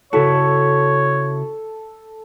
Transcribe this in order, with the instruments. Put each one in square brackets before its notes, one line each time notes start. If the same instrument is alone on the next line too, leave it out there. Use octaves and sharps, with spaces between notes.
[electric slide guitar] C#3 E4 F#4 [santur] A4 [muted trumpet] C#5